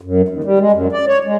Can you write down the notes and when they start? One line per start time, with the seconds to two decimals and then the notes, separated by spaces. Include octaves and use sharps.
0.01 F#2
0.28 D#2
0.44 G3
0.59 G#3
0.72 F#2
0.92 D5
1.08 C#5
1.24 G#3